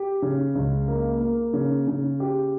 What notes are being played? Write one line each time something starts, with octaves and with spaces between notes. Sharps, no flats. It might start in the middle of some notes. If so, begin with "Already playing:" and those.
Already playing: G4
C#3
C#2
A#3
A#3
C#3
C#3
G4